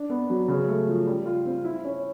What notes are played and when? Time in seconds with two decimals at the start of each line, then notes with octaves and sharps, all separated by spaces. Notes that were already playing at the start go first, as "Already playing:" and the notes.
Already playing: D4
0.10 B3
0.30 F#3
0.48 C#3
0.68 A3
0.88 F3
1.07 G3
1.26 F4
1.45 C4
1.64 E4
1.84 C#4